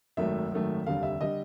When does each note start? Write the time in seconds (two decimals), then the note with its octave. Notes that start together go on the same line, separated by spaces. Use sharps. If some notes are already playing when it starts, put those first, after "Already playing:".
0.17 G#1 F#2 D#3 F#3 A3 E5
0.51 G#1 F#2 D#3 F#3 A3
0.87 F1 D#2 D3 G3 F5
1.03 E5
1.21 D3 G3 D#5